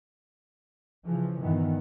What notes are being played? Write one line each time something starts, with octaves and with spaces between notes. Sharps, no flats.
C#3 E3 F3
G2 A#2 D#3 E3 B3